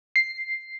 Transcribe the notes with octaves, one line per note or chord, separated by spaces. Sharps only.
C7